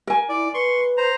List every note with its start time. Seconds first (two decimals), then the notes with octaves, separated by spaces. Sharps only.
0.07 A#4 G#5
0.29 E4 D5
0.54 B4 C6 C#6
0.97 C5 A#5